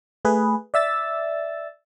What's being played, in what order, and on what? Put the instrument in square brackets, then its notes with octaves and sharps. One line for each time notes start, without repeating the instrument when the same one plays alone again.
[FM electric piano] A3 G#4 B4
D5 E5 E6 A6